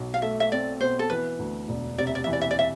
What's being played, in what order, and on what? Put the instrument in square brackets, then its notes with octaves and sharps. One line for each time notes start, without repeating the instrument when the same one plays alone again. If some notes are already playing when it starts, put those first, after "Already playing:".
Already playing: [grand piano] B1 B2
[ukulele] F5
[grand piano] A3 [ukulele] E5
[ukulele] E5
[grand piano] C4 [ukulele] D5
[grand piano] B2 [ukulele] C5
[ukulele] A4
[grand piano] E3 [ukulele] B4
[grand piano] D2
E1
[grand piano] C3 [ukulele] D5
[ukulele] E5
D5
[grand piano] E3 [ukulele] E5
[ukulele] D5
E5
D5
E5